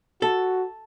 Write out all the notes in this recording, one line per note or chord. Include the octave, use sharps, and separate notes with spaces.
F#4 A4